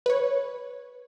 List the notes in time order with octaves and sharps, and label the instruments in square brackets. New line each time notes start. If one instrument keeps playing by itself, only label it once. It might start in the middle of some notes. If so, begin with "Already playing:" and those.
[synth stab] B4 C#5